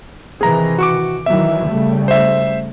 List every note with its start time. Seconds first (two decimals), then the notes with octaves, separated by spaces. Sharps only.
0.41 C3 D#3 E3 G#4 A#5
0.78 F#4 C#6 D6
1.26 D#3 E3 F#3 E5
1.68 C#3 G3 A3
2.08 C5 E5